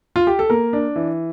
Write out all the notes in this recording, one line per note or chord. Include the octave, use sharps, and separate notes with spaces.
F4
G4
A4
A#3 A#4
D4
E3